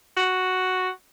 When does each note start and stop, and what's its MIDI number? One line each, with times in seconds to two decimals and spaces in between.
0.17 0.89 66